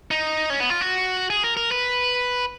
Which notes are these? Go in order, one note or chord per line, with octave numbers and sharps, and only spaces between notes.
D#4
C#4
B3
F4
F#4
G#4
A#4
A#4
B4